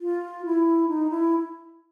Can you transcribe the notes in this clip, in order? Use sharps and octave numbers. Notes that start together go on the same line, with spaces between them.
F4
E4
D#4
E4